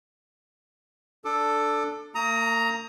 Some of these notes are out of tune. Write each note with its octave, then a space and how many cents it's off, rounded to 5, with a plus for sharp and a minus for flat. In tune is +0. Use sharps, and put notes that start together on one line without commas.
D4 +0 A4 +5 D6 +30
A#3 -40 A#5 +0 D#6 +30